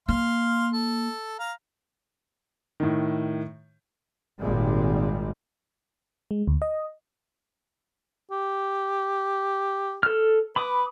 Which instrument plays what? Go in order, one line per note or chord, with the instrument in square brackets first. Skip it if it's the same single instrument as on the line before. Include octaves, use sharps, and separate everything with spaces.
[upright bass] A#3 [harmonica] F5 C6 F6
[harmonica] A4
F5 A#5
[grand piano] A2 D#3
[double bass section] G#1 A#2 D#3 G3 G#3
[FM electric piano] G#3
D2
D#5
[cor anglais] G4
[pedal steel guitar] A4 F6
[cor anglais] B4 [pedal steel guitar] B5 D6 D#6